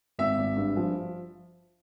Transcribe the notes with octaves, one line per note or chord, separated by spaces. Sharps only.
G#1 E5
G#1
G2
F3